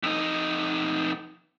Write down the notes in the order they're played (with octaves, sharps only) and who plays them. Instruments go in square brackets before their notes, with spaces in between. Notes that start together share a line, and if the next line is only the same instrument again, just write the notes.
[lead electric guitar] F2 D#4